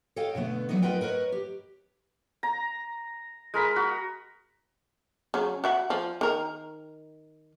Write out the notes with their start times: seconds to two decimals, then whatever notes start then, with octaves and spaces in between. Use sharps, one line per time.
0.16 A4 C#5 D#5 F5 G5
0.35 B2 D3 A3 B3
0.69 F3 F#3 A3 B3 D4 D#4
0.82 F4 A#4 B4 D#5 F#5 G5
1.01 A#4 B4 C#5 D#5
1.32 G4
2.43 A#5
3.54 G#3 A#4 B5
3.76 F#4
5.34 C#3 F#3
5.64 F#4 E5 F#5
5.90 F3
6.21 D#3 A#4